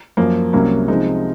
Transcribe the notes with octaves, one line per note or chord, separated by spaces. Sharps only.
F#2 F3 A#3
C2 C3 F#3 A#3 C#4
C3 F3 G#3 D#4